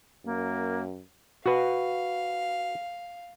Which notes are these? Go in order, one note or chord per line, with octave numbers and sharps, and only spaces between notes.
F#2 A#3
F#4 B4 F5